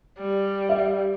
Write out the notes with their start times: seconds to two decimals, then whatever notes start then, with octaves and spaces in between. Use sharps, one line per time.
0.19 G3
0.69 E5